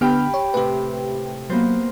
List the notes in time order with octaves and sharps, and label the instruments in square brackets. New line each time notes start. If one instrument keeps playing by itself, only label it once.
[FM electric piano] D3 B3 F6 [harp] G4 G5 B5
[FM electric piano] C#5
[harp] A2 C3 [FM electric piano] G4 B4
[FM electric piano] F#3 [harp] A#3 B3 C5